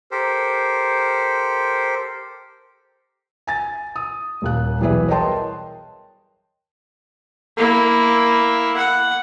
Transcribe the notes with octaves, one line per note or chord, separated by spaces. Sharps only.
G4 A4 A#4 C5
G#5 A6
D#6
D#1 D#2 F#6
B1 E3 G3 G#4 B4 E5
A#4 C#5 D#5 G5 A5 C6
A#3 E4
F#5